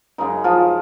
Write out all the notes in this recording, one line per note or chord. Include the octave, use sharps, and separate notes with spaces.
F#2 C#3 G#3 D#4
F3 F4